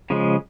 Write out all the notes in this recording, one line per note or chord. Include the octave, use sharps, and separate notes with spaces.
C#3 F3 G#3